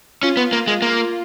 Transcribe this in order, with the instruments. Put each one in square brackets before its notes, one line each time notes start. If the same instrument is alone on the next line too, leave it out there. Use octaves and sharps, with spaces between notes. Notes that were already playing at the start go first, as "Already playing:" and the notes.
[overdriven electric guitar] C#4 [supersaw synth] F4
[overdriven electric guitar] B3
A#3
G#3
A#3